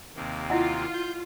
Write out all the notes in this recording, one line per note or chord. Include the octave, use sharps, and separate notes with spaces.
D#2 C3 A#3
E4 F4 D#5 F#5
G6